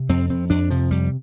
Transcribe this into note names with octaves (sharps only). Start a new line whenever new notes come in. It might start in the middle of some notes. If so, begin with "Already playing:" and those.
Already playing: C3
F2 C4
F2 C4
F2 D4
C3 F3
F2 G3